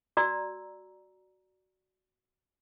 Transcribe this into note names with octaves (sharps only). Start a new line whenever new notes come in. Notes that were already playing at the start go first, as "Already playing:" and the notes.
F#4 D5 A#5 E6